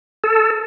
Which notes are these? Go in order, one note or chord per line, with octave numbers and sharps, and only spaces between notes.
A4